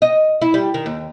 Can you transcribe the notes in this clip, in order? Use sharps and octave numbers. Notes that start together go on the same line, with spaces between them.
D#5
E4
G3
D#3
D#2